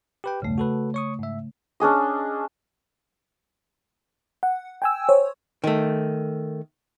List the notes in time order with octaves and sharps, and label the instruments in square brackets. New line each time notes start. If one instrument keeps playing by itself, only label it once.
[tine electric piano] G4 B4 G5
[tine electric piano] B1 E2 G2 [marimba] C#3 A3
[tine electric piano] F#4 A4 B4
C#5 C#6 D#6
G#2 E5
[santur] C#4 D4 G#4 D#5
[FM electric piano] F#5
G5 G#5 E6
C5 C#5
[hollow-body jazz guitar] D#3 A3